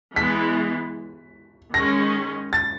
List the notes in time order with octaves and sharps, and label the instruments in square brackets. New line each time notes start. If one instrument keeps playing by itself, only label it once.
[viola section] E3 G#3 B3 [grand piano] B6
[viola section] D#3 G#3 C#4 [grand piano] A#6
[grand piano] A6